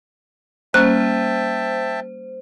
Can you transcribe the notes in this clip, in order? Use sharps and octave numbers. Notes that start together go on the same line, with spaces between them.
G3 A#3 C#4 C5 E5 G5 A5 F#6